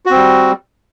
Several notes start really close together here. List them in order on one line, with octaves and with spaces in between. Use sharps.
F#4 C4 G3